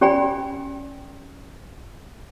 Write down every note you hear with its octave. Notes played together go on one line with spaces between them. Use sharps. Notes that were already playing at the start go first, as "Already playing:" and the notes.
C#4 G4 D5 G5 G#5 B5